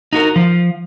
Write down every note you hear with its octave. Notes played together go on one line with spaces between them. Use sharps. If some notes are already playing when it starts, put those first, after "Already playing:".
D#4 F#4 A#4
F3